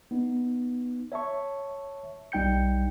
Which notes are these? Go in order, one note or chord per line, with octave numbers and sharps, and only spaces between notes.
B3 D#4
C#5 E5 A5 C#6
B1 G3 D#4 G5 G6 C#7